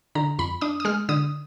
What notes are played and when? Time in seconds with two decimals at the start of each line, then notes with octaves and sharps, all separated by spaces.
0.15 D3 A#5
0.39 F2 B5
0.61 D4 D#6
0.80 D#6
0.85 G#3 F6
1.09 D3 D#6